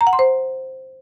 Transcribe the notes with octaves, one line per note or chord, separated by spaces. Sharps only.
A#5
F#5
C6
C5